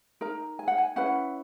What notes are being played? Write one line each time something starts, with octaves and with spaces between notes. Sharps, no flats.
D#4 A#4 A#5
G#5
F#5
G#5
C#4 E4 B4 F#5